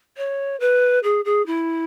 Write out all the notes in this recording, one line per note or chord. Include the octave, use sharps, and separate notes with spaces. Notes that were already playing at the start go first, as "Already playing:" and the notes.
C#5
B4
G#4
G#4
E4